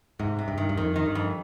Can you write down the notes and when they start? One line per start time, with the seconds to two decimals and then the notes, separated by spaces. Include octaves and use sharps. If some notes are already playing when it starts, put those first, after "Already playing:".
0.19 G#2 C3
0.39 C3
0.48 G2
0.58 D#3
0.69 G2
0.77 F2 D#3
0.96 D#3
1.06 G2
1.15 F2